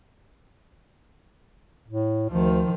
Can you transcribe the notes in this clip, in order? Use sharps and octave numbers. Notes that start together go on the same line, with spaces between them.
A2
D2 D#3 F3